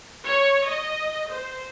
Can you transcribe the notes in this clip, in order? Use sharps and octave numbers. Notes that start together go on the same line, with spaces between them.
C#5
D#5
C5